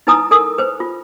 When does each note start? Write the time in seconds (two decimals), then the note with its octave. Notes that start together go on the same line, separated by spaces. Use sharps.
0.07 D#4 E4 B4 G#5 A#5 D#6
0.31 A4 A#4 G#5 D#6
0.58 B4 C5
0.80 F4